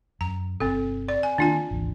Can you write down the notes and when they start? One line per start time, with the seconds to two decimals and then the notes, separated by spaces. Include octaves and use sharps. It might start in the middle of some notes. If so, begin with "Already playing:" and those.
0.21 F#2 A#5
0.60 G1 C3 C4 A4
1.09 D5
1.23 G#5
1.38 D#3 A#3 D4 F4 G#5
1.71 G#1 D2 E3